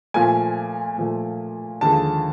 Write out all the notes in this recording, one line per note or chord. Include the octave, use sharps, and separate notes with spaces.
A#2 F3 A3 G#5
A#2 F3 A3
D#2 D3 F3 G#3 A5